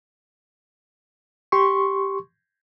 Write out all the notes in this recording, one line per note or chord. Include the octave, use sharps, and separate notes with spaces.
G4 C6 C#6